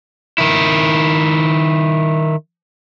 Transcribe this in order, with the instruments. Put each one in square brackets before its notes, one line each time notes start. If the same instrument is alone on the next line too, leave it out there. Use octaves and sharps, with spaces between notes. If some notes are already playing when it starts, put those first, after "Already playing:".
[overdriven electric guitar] D#3 E4